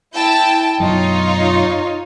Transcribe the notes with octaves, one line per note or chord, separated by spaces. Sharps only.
E4 G5 A5
F#2 B2 F#3 D#4 F4 C#5